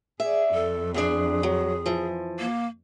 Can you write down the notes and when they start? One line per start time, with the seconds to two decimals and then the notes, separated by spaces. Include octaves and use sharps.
0.20 G#4 D5 E5
0.54 F2 A4
0.94 E2 D4 G#4
1.43 F#3
1.86 E3 F3
2.39 A#3